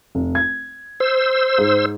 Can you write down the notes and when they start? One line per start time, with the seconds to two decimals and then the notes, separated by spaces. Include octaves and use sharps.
0.15 F1
0.35 G#6
1.00 C5 E6
1.58 G#2